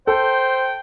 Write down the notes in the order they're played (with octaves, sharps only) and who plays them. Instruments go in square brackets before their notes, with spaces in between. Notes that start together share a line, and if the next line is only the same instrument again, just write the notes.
[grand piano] A4 [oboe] C5 [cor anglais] G5